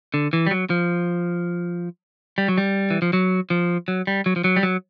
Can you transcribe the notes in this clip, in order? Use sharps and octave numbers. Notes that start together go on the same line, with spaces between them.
D3
E3
G3
F#3
F3
G3
F#3
G3
E3
F3
F#3
F3
F#3
G3
F#3
F3
F#3
G3
F#3